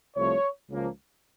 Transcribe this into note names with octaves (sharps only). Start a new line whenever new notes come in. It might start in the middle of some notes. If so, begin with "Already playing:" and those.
C2 C3 F3 A3 C#5
C#2 C#3 F3 A#3